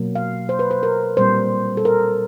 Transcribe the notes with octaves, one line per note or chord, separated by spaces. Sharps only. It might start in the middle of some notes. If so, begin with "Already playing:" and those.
Already playing: B2 F#3 A#3
F5
C5
B4
C5
A#4
A#2 G3 C4 C5
A4
A#4